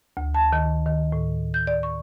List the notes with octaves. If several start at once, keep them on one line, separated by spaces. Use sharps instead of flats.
D2
A5
D#3
D#3
A2
G6
D5
C#6